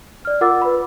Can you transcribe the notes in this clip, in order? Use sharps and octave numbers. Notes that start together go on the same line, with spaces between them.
D5 F6
F4 A#4 F#5 D6 E6 A6
B4 B5